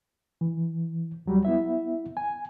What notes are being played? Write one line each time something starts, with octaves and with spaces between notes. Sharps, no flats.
E3
D#2 F#3 G3
B3 E4 E5
G#5